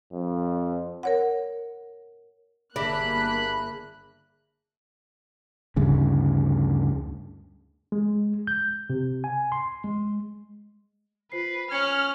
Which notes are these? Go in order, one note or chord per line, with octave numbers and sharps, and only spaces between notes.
F2
A#4 C#5 F#5
G1 A#3 D4 G#4 E5 B5 F#6
D2 G2 C#3
G#3
G6
C3
G#5
C6
G#3
F4 B4 C5 C7
C#4 F6 G#6 C#7